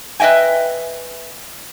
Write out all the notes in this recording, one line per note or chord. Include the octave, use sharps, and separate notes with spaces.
B4 D#5 E5 G5 G#5